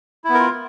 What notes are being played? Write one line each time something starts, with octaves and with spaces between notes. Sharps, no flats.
B3 E4 F4 A#4